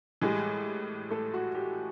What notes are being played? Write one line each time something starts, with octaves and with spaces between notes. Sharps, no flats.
A2 E3 G3 G#3 G#4
A3 A4
F#4
G4